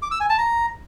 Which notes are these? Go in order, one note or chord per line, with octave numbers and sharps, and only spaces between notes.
D6
E6
G#5
A5
A#5